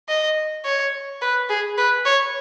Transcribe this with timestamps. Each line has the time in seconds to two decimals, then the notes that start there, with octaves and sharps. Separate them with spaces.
0.09 D#5
0.65 C#5
1.22 B4
1.50 G#4
1.78 B4
2.06 C#5